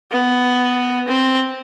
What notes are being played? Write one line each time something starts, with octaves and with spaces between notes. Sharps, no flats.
B3
C4